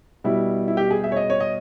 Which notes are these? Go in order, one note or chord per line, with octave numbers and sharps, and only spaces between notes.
B2 G3 E4
E4
G4
G#4
E5
C#5
D#5
C#5
D#5